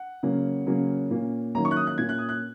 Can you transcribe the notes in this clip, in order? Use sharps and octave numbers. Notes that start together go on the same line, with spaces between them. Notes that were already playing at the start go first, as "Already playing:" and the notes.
Already playing: F#5
C#3 F#3 A#3 C#4
C#3 F#3 A#3 C#4
A#2 A#3 C#4
D#3 F#3 A#3 C#4 A#5
C#6
F#6
D#6
F#6
A#2 A#3 C#4 G#6
F#6
D#6
F#6